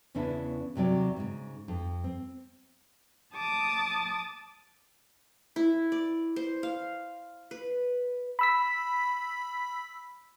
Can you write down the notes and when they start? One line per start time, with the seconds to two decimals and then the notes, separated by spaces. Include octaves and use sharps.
0.15 E2 C#3 B3 C#4 D4 E4
0.75 D#2 C3 F#3 D5
1.16 G#2 C#3
1.68 F2
2.04 C4
3.34 A5 D6 D#6 A6
5.56 E4
5.92 D5
6.36 C5
6.63 F5
7.51 B4
8.39 B5 E6 B6